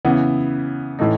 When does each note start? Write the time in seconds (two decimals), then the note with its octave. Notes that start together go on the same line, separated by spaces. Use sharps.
0.05 C#3 E3 B3
0.99 A2 E3 A3 D#4